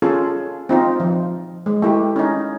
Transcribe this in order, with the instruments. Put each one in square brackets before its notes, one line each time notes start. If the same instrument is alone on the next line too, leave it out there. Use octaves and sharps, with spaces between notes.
[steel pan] C#4 F4 G#4 A4
C4 D#4 F4
F3
G#3
A3 E4 G4
C#4 D#4